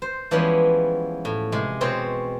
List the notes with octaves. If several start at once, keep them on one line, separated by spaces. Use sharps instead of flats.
C5
E3 F3 G3 G#3 B3 C#4
A2
C3 G#3
B2 C4 C5 C#5